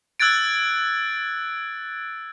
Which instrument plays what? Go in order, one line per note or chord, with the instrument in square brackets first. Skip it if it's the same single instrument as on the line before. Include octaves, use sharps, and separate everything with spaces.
[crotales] E6 F#6 G#6 A6 D7